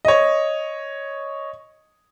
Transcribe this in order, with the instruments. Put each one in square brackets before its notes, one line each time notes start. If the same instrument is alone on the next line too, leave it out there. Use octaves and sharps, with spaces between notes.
[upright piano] C#5 D#5